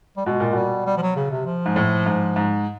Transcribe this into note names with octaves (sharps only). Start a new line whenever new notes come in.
G3
B2 G#3
A#2
B2 G3
G3
F3
F#3
C#3
C3
F3
G#2
A2
G#2
G#2